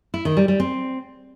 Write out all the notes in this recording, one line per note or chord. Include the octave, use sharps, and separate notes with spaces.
E4
D#3
G3
G3
C4